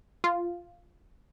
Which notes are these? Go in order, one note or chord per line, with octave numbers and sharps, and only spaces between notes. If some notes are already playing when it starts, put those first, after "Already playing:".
F4